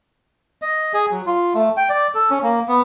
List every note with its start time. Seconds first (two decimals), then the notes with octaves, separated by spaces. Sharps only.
0.62 D#5
0.93 G#4
1.11 F#3
1.26 F4
1.54 A3
1.77 G5
1.89 D5
2.15 A4
2.30 C#4
2.43 A#3
2.68 B3